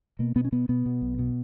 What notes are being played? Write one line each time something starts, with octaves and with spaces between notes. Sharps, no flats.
B2 A#3
B2 B3
C#4
B2 B3
B2 B3
B2
B1
B2